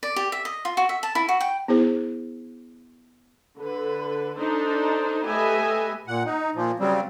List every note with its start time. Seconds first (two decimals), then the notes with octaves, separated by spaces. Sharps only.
0.03 D5
0.16 G4
0.32 E5
0.45 D#5
0.65 F4
0.77 F#4
0.89 E5
1.03 A5
1.15 E4
1.29 F#4
1.41 G5
1.68 B3 E4 G#4 C5
3.57 D3 B4
4.40 D4 D#4 A4 C5
5.27 A3 G4 B4 D#5 E5 G#5
6.07 A#2 F#5
6.26 D#4
6.55 A#2 F3
6.80 C#3 F#3 G3 C4